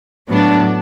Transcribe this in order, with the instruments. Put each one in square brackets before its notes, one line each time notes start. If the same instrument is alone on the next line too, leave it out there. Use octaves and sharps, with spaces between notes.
[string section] A2 F#3 B3 D4